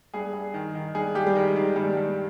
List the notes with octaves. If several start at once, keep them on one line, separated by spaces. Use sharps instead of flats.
G2 G#4
G2
D#3
D#3
G2 G#4
G2 G4
G3
D#3 G#3
D#3 G3
G2 G3
G2